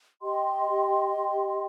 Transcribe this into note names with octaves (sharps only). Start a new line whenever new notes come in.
G4 D#5 G5 C6